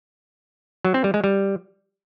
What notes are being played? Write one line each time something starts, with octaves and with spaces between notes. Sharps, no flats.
F#3
C4
G3
G#3
G3